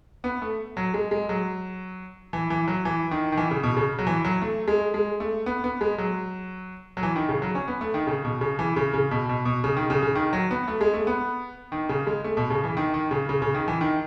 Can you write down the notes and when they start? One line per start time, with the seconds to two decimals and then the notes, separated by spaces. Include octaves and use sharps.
0.24 B3
0.42 A3
0.77 F#3
0.94 G#3
1.11 G#3
1.29 F#3
2.33 E3
2.50 E3
2.68 F#3
2.85 E3
3.11 D#3
3.32 D#3
3.37 E3
3.51 C#3
3.63 B2
3.77 C#3
3.99 F#3
4.07 E3
4.25 F#3
4.42 A3
4.68 G#3
4.94 G#3
5.20 A3
5.46 B3
5.64 B3
5.81 G#3
5.98 F#3
6.97 F#3
7.03 E3
7.16 D#3
7.29 C#3
7.42 F#3
7.55 C#4
7.68 B3
7.81 A3
7.94 D#3
8.07 C#3
8.25 B2
8.41 C#3
8.59 E3
8.76 C#3
8.94 C#3
9.11 B2
9.29 B2
9.45 B2
9.64 C#3
9.77 D#3
9.90 C#3
10.03 C#3
10.15 D#3
10.33 F#3
10.51 B3
10.68 A3
10.81 G#3
10.94 A3
11.07 B3
11.72 D#3
11.89 C#3
12.07 G#3
12.24 A3
12.37 B2
12.50 C#3
12.64 E3
12.77 D#3
12.94 D#3
13.11 C#3
13.29 C#3
13.42 C#3
13.54 D#3
13.68 E3
13.81 D#3